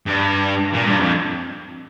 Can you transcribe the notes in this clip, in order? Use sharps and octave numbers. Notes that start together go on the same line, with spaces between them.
G2
A#2
G2
F2